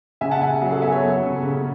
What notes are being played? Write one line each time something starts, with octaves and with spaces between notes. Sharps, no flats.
C#3 E5 G#5
F#5 A5
C#3 E5 G#5
F#3 G#4
A4
B3 E5 G#5
A4 C#5
F#3
C#3
C#3